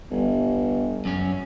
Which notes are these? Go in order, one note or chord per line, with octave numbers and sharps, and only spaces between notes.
G1
F#2 C#4